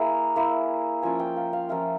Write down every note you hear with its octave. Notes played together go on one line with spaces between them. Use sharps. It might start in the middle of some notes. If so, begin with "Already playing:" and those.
Already playing: A#3 E4 G#4 A#4
A#3 E4
F3 A#3 C#4 F4 G#5
G5
F5
F5
F3 A#3 C#4 F4 E5